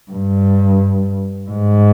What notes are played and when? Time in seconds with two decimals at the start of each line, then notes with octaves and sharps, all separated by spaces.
0.11 G2
1.49 G#2